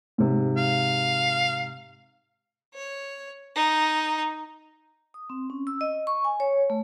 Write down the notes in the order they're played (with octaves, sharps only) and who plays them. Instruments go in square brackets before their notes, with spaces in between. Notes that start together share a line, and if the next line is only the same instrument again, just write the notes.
[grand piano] G#2 C3
[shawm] F5
[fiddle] C#5
D#4
[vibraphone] D#6
C4
C#4
E6
D#5
C#6
G#5
C#5
A3